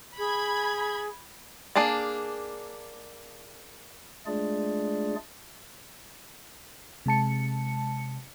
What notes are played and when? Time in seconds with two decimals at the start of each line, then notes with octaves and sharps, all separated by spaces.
0.18 G#4 B5 G#6
1.76 A#3 D4 G#4 D5 A5
4.26 G#3 A3 D4 F4 G#4 D5
7.06 C3 G#3 A5 C#7